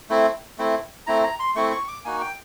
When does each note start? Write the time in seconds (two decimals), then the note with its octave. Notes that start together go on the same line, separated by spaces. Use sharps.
0.10 A3 C4 E4
0.58 A3 C4 E4
1.07 A3 C4 E4 A#5
1.24 A#5
1.39 C6
1.55 A3 C4 E4 C#6
1.72 C#6
1.88 D6
2.05 A#3 D#4 F#4 G#5
2.21 G5